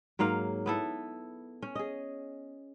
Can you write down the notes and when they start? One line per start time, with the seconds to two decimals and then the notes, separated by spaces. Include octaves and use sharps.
0.19 G#2 F#3 A#3 F5
0.66 B3 E4 A4
1.62 C#4
1.75 G#4 D#5